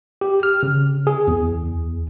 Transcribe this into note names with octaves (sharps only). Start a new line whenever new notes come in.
G4
F6
C#3
G#4
E2